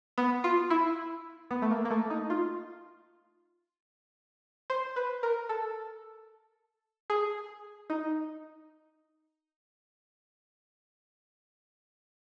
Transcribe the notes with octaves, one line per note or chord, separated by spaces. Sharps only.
B3
F4
E4
B3
A3
A#3
A#3
A3
D#4
F4
C5
B4
A#4
A4
G#4
D#4